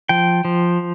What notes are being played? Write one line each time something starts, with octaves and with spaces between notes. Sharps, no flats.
F3 G5
F3